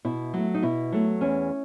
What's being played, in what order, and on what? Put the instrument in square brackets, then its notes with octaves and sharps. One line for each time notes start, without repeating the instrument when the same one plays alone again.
[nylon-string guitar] B2 E4
F#3 A3
D#4
B2 E4
F#3 A3
E2 C#4